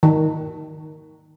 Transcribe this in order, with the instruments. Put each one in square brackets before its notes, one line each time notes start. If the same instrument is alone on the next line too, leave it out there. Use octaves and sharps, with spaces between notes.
[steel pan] D#3